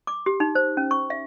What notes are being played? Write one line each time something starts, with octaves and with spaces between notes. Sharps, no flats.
D6
G4
D#4
C5
C#4
C#6
E5